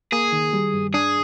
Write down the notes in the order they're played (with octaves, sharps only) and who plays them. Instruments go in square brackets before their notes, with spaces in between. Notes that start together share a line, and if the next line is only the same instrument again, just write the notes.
[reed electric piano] A#3 [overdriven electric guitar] G#4
[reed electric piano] D#3
G3
G2
[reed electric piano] D4 [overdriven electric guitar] G#4